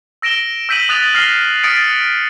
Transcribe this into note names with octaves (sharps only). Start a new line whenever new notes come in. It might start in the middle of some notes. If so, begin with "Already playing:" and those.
E6 A#6 D7 E7 G7
E6 G6 B6 D#7 F#7
D#6 F#6 A6 B6 F7
F6 A#6 C7 G7
D#6 A6 B6 C#7 D7